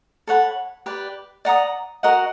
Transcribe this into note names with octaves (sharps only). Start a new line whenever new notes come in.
A4 C#5 F#5 B5
G4 B4 D5
D5 F#5 A#5 D#6
F#4 A#4 D#5 F#5